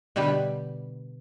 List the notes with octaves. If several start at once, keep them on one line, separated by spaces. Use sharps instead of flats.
B2 D3 G3 G4 B4